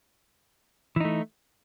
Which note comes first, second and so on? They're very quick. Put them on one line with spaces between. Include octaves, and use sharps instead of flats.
E3 D#4 A3